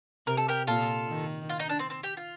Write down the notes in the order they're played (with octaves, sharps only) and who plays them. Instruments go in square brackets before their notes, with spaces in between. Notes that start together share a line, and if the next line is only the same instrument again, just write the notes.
[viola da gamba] C3 [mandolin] A#4
[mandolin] A4
G4 A#4
[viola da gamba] A#2 [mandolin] F4 A4
[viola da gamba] D#3
[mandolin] F4
D#4
D4
C4
C4
G4
F4